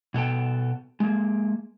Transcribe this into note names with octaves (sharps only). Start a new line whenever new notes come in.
B2 B3 A4 G5
G#3 A#3